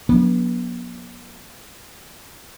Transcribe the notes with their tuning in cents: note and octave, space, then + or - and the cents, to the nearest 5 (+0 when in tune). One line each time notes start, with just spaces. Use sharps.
F#3 -40 B3 -40 D4 -45